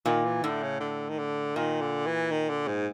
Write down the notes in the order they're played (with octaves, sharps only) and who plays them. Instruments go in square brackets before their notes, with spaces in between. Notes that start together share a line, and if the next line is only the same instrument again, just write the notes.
[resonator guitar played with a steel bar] A#2 [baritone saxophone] D#3
[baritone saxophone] E3
[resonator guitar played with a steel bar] A2 [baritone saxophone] D3
[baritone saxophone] C#3
D3
D#3
D3
[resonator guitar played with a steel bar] A#2 [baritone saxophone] D#3
[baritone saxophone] D3
E3
D#3
D3
G#2